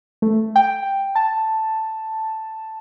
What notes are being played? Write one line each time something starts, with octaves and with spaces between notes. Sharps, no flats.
A3
G5
A5